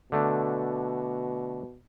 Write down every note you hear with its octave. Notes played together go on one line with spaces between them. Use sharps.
B2 D3 A3 D4